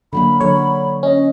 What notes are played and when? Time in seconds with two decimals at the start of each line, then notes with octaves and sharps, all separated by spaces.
0.13 D3 F#3 A#3 B5
0.40 D3 F#3 C#5
1.03 C#4 D#5